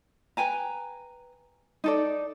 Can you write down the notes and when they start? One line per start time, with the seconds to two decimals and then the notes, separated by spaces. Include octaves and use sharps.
0.37 B4 G5 G#5 A#5
1.84 D#4 A4 D5